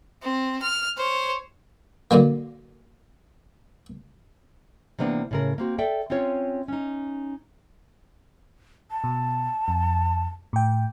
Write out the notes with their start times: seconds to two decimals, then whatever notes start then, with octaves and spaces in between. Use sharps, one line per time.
0.22 C4
0.62 F6
0.97 C5 C#5
2.11 A#2 D3 F#3 A#3
4.99 C3 E3 A#3 B3 D4
5.31 A2 C#3 A#4
5.58 A#3 C4 F#4
5.78 A4 D5 E5 G5
6.10 C4 C#4 F4 C#5
6.68 C#4 D#4
8.91 A5
9.04 B2
9.68 F2
10.53 A2 G5